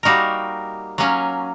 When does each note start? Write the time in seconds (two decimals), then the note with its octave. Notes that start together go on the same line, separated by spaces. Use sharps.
0.03 G3 A#3 D#4 F#4 A#4
0.98 F#3 A#3 C#4